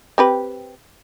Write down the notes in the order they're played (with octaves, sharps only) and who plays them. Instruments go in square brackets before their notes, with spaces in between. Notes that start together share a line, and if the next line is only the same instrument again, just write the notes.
[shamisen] C4 G4 B4